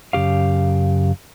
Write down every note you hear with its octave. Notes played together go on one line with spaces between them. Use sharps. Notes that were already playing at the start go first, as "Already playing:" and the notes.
F#2 C#3 G4 F5